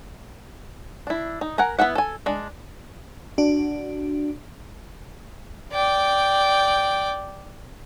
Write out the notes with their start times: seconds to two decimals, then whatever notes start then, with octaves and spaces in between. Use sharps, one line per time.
1.07 D4 E4
1.41 D#4
1.58 A#4 F#5 G#5 A#5
1.79 B3 E4 E5 F#5
1.95 A4 G#5
2.26 G#3 D4
3.38 D4 F#4
5.72 D5 G5